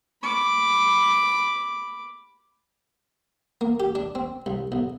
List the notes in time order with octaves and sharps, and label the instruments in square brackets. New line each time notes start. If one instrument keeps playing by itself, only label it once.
[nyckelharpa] B5 D6
[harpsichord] A#3
G4
D4
C4
C2
B1